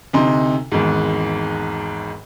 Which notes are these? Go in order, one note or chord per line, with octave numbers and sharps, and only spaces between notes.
D2 C3 D#4 C6
G#1 E2 G#2